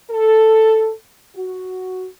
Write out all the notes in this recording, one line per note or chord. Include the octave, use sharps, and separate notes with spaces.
A4
F#4